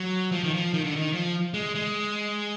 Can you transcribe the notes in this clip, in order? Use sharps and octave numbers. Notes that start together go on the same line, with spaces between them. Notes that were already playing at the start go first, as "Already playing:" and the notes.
Already playing: F#3
F3
D#3
F3
D#3
D3
D#3
F3
G#3
G#3